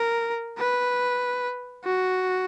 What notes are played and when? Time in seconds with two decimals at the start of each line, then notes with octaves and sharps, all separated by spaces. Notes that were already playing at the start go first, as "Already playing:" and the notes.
Already playing: A#4
0.58 B4
1.85 F#4